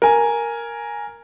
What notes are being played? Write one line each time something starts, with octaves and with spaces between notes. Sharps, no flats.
A#4 G#5